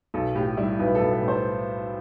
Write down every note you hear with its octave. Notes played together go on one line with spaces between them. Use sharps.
B1 A4
A2 G4
G3 E4
B1 B4
A4
B1
B4
A2
C5